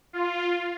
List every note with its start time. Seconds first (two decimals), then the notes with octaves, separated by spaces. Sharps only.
0.13 F4